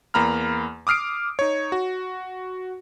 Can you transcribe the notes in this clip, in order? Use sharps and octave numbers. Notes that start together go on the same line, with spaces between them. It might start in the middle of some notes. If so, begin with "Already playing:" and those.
E2 A#3 A#5 B5 F6
D6 D#6 F6 C7 D7
D#4 C#5
F#4